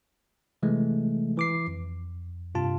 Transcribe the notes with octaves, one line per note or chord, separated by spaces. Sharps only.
C3 E3 G#3 A3
E3 D6 C7
F2
G2 C3 F4 A5